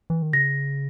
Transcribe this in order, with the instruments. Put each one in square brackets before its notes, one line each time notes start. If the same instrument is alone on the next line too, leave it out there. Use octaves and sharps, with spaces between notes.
[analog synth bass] E3
D#3
[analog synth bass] C#3 [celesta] A#6